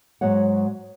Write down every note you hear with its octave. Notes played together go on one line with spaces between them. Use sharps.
G#2 F#3 G#3 F#4 C#5 F#5